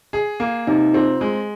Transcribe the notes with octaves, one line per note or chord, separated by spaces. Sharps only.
G#4
A#3
C3 D#4
C4 F4
G#3